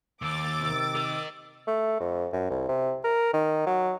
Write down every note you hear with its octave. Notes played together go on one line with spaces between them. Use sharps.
D#2 D6 E6 A6
C3 D#3
A#4 D#5
A3
F2
F#2
C2
C3
A#4
D#3
F#3